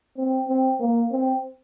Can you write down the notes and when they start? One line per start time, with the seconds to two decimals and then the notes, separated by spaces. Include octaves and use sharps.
0.18 C4
0.49 C4
0.80 A#3
1.11 C4